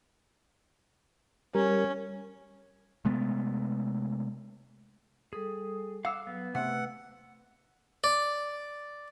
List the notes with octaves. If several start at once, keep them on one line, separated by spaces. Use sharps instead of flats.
G3 C#4 A#4
C3 G#3 A3 B3
G3 G#4 A4 D#6
F5 F#5 D6 E6
F#3 B3
C3 A3 B4 F#5 E6
D5